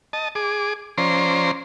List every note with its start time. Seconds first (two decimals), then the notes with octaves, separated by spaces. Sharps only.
0.13 D#5 A5
0.35 G#4 D6
0.98 F3 C#4 C5 D5 A#5 C6